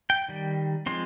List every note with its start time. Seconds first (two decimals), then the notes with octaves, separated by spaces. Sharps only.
0.10 G5
0.28 D#3 G3
0.86 F3 G#3 C4 C6